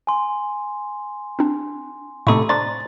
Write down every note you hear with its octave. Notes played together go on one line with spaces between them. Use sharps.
G#5 C6
C4 D4
A2 C3 A3 D#4 E4 A4 C#6
D4 C5 A#5 A6